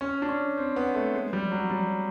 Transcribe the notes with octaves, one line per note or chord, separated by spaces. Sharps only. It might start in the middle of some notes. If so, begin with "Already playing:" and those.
C#4
D4
C#4
C4
B3
A3
G#3
G3
F#3
G3